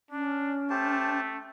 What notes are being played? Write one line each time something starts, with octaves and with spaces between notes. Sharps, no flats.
C#4 D4
A3 G4 C5 A5